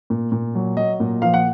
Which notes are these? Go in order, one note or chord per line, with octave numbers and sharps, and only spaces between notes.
A#2
A#2
F#3
F#3 D#5
A#2
F3 F5
F#5